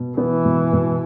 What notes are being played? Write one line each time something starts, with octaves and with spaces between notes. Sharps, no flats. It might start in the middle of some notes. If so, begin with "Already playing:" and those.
Already playing: B2
E3 B3
B2
B2